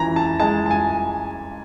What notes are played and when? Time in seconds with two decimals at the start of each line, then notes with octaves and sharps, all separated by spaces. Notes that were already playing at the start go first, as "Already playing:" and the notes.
Already playing: E3 C#4 A#5
0.16 A5
0.40 G#3 A5
0.66 A5
0.71 G#5